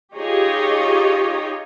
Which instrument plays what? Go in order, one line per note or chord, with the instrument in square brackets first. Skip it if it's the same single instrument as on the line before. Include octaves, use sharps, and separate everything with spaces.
[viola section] D#4 F4 G4 G#4 C#5 D#5